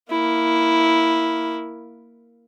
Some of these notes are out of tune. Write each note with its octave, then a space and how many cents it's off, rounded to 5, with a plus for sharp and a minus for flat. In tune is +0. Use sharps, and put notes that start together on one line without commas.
A#3 +0 E4 -5